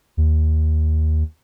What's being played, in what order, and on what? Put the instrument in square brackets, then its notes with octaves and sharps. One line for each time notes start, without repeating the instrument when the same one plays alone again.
[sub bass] D#2